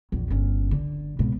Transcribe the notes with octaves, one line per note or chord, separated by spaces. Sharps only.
A#1 E2
G1 C#4
D3
G#2 B2